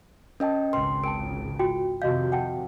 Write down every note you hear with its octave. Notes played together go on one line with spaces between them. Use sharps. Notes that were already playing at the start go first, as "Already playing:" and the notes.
C#4 A#4 D#5 G5 A5
G#1 C#2 C#3 B4 G5 C6
A#4 G5 A5 D7
F4 F#4 G5
F2 C3 D#3 F#4 D#5 F5 G6
F#5 G5 A5